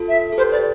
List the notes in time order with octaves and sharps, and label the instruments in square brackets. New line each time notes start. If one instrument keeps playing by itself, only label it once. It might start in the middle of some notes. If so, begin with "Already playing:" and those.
Already playing: [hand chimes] F4 A4
[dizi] E5
[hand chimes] A4
[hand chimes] G4 B4 [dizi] C5
[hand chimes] G4 B4 [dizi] D5